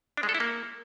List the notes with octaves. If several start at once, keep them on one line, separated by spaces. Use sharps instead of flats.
D4
G#3
A4
E4
A#3